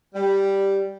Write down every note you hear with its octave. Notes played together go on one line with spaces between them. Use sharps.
G3